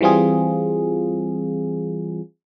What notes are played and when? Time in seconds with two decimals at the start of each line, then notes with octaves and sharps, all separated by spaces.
0.01 E3 G3 C4 F4 G#4